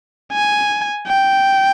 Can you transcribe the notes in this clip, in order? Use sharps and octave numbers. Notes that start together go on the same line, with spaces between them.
G#5
G5